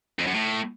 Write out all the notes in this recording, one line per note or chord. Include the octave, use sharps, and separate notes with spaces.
F2
F#2
A2